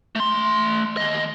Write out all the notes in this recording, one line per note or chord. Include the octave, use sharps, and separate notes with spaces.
A3 C6
D#2 D#5